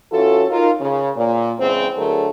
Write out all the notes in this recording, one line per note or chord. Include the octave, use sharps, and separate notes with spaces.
E3 C#4 F4 F#4 A4
D#4 F4 A#4
C#3
A#2
E2 C#3 G#3 C4
D3 F#3 A3 G#4 A#4